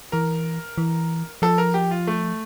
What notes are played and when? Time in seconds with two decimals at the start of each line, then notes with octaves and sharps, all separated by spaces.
0.12 E3 A#4
0.78 E3
1.42 F3 A4
1.58 A#4
1.74 G4
1.91 F4
2.07 A3